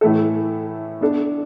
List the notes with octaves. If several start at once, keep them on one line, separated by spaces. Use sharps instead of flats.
A2 E3 A3 E4 A4
B3 D4 A4